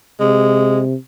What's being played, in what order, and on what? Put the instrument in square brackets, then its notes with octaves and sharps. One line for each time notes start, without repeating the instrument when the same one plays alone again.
[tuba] C3 [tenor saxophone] G#3